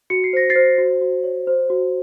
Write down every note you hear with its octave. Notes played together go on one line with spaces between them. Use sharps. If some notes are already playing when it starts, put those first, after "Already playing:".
F#4 C#7
C7
C5 A#6
A6 C7
C5
F#4
F#4
C#5
C5
F#4